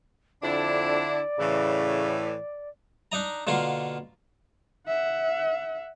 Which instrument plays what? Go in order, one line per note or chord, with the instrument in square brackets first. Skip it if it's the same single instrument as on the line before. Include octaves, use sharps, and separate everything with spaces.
[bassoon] F2 [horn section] D3 D4 E4 [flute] D5
[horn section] A2 E3 [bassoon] C#3
[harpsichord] D4 D#4 D#5 A#5
B2 D3 A#3 F4
[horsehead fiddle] E5 F#5